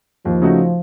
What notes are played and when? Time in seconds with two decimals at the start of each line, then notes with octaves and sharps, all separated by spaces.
0.25 D#2 F3
0.42 C#3 A3 D#4 F#4